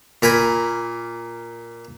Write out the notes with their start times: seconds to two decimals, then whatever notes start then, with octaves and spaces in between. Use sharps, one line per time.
0.22 A#2 A#4 G#5 B5